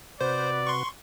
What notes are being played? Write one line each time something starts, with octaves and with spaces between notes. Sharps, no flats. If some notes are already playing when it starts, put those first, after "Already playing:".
C3 F#4 B4 C5 D5
C6 C#6